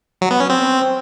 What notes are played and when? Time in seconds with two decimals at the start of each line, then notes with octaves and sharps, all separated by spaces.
0.21 F#3
0.31 B3
0.40 C#4
0.50 C4